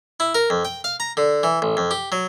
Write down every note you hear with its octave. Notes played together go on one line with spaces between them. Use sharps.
E4
A#4
F2
G5
F5
A#5
D3
E3
A1
F2
G4
F#3